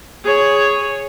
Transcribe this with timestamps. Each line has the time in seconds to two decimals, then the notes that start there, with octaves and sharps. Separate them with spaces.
0.24 G#4 C#5